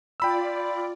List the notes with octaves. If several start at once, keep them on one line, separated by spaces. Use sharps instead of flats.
F4 D5 G5 B5 E6